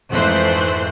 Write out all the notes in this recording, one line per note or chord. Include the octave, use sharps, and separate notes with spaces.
F2 G#2 E3 A3 C5 F#6